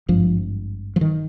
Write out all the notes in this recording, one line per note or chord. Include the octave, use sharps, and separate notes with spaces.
G#1 G2 F3
F3
D#3